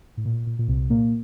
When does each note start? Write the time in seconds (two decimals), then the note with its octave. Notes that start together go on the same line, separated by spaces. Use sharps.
0.17 A2
0.25 A#2
0.47 A#2
0.59 A#2
0.68 C2 C3
0.90 A#2 A#3